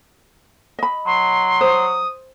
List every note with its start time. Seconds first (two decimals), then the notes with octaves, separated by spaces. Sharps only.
0.79 D#5 B5
1.06 F#3 C6
1.61 C5 D#6